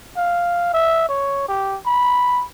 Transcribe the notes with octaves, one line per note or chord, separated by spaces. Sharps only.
F5
E5
C#5
G4
B5